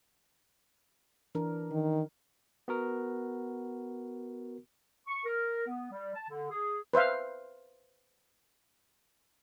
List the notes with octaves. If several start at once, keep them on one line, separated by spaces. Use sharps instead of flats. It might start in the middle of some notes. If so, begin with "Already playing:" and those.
E3 D4 A#4
D#3
B3 F#4 A#4
C#6
A#4
B3
G3
A5
D3
G#4
B4 C5 E5 F5